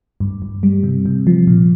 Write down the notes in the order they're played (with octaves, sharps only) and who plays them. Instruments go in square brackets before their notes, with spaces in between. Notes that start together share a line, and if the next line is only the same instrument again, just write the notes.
[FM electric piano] G2
G2
G3
C3
C3
F3
A#2